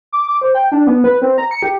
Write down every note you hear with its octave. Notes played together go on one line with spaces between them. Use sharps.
D6
D6
C5
G5
D4
B3
B4
C4
A#5
C#7
G4